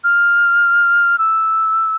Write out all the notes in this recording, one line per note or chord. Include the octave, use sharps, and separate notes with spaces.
F6
E6